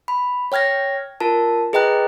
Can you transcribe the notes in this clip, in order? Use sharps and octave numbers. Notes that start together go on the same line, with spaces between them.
B5
C#5 G5 F6 G#6 A#6
F4 A#4 A5
G#4 B4 D#5 G5 A#5 F#6